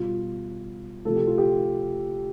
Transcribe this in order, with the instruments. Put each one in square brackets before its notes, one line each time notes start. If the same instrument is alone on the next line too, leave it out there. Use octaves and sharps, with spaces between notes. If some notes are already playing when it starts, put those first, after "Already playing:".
Already playing: [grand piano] B2 G3 F4
C3 F3 A3 A4
G4
F4
G4